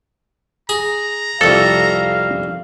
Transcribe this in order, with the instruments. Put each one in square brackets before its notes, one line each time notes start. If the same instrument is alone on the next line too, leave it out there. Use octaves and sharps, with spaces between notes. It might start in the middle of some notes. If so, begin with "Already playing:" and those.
[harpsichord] G#4 [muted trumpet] A#5
[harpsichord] C2 F2 [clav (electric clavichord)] A4 [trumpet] F5